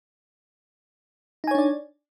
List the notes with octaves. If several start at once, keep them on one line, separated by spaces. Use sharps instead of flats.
D4 D#4 C#5 D5 G#5